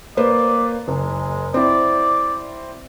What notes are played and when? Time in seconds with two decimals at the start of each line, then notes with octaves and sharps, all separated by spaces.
0.17 A#3 B4 C5 D5
0.88 F#1 G#3
1.54 C4 E4 D5